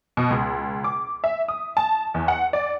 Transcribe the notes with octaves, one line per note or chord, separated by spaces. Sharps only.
B2
C#2
D6
E5
D#6
A5
E2
F#5
D5